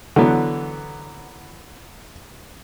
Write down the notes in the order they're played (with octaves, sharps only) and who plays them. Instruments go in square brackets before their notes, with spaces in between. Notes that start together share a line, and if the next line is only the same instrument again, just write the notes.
[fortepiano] D3 E3 F#3 B3